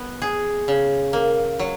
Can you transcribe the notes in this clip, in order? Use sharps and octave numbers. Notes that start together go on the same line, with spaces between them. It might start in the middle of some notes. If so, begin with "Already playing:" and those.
Already playing: B3
G#4
C#3
A#3
F#3